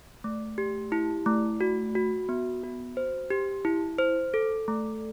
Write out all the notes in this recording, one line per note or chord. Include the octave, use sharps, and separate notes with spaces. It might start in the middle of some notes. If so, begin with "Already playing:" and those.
A3
G4
E4
A3
F#4
F#4
B3
F#4
C5
G4
E4
C5
A4
A3